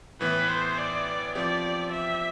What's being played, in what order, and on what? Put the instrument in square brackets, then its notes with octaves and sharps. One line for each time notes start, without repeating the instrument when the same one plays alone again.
[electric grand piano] A2 E3 B3 [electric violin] B4
[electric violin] C5
D5
[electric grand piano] F3 C4 G4 [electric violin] D5
[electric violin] E5